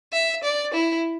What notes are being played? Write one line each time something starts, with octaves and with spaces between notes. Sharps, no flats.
E5
D5
E4